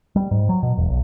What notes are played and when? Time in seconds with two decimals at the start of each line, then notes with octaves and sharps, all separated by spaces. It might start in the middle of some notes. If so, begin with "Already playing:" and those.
0.16 G3
0.31 G#2
0.49 F#3
0.63 B2
0.77 E1
0.90 B1